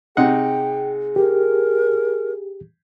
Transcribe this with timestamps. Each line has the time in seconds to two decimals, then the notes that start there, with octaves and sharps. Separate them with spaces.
0.17 C3 D#4 G#4 F#5 G5
1.16 G4 A#4